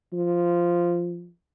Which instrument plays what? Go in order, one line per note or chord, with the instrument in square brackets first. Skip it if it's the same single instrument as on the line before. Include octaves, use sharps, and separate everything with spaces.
[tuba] F3